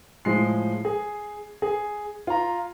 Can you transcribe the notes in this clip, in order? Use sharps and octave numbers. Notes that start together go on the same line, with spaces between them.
A2 F3 G#3 C7
G#4
G#4
F4 A#5